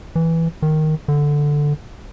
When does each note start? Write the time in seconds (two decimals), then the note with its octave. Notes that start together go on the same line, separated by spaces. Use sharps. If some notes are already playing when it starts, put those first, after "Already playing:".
0.16 E3
0.62 D#3
1.08 D3